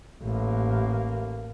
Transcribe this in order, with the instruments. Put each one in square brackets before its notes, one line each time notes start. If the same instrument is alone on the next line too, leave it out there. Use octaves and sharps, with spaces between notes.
[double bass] A1 A#3